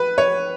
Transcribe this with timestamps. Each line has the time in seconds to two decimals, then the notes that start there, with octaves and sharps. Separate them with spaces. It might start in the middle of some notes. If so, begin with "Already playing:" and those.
Already playing: B4
0.18 C#5